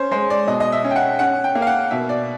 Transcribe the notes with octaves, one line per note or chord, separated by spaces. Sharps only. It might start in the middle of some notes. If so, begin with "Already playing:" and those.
Already playing: C#4 C5 C#5
G#3 C5
D5
B2 D#5
D#5
E5
C#4
G5
F#5
C#4 F#5
G5
A#3
F5
F#5
B2 E5
D5